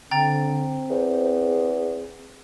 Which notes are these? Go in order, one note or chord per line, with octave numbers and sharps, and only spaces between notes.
D3 C4 G5 A#5 A6
E2 C5
G#4